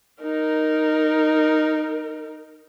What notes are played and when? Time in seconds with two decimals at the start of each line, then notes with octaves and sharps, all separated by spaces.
0.22 D#4 A#4